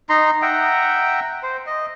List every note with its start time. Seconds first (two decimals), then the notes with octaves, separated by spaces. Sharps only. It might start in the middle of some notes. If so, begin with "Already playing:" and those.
0.09 D#4 A#5 C6
0.42 E5 F#5 G5 A#5
1.43 C5
1.66 D#5